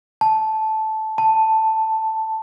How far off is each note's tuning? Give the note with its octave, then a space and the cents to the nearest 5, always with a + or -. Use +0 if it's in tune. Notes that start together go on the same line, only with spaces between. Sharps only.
A5 -10
A5 +5